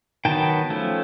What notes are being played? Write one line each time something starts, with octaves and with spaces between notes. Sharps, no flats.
D#3 F#3 B3 G5 A5
F3 A3 C#4